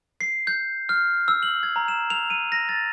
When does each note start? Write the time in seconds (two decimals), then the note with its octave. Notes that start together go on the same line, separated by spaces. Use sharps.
0.21 C7
0.47 G6
0.89 F6
1.28 E6
1.43 F#7
1.63 G#6
1.76 A#5
1.88 E7
2.10 F7
2.30 D#7
2.52 A#6
2.69 A6